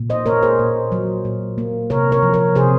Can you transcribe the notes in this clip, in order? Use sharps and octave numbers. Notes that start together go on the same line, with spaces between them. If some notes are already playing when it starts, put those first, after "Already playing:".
Already playing: A#2
C5 D#5
A#3 A#4 C#5
G#4 C5
A#2
F#3
A#2
A#3
C3 A#4 C#5
A#4 C#5
F3
A#4 C#5
C3 G#4 C5